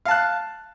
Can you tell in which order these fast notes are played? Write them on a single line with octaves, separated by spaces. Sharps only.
F5 A5 F#6